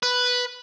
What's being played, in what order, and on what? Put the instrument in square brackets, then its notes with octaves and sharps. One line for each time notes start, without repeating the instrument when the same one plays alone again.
[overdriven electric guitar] B4